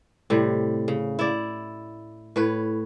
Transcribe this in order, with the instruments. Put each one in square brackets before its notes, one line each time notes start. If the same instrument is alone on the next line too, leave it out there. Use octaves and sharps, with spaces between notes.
[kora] A2 C3 G3
C#3
E4 D5
A2 B4 C#5